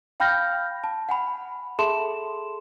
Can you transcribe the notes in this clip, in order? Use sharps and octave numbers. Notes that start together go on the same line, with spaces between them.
F5 G5 B5 F6 G6 A#6
A5
F#5 G#5 B5
G#4 A4 E5 A5 C6 E7